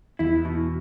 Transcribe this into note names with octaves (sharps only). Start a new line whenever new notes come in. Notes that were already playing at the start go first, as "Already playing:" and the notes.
E2 E4
B2